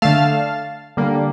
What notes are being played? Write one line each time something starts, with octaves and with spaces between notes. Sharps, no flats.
D3 A3 F5 A5
D3 G3 A#3